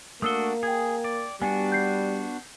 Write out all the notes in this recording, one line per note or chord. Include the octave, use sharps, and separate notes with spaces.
A3 A#3 D4 F#4 D#6 E6 G7
G#4 G5 G#6
D5
G3 B3 D4 F#4 G#5
G6 C7